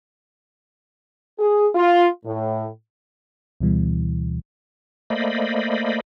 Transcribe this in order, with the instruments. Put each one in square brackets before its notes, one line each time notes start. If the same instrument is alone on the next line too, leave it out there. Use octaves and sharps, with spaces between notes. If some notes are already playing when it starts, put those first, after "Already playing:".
[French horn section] G#4
F4
A2
[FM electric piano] D2 B2 E3 G3
[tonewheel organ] A3 A#3 C5 D5 D#5 B5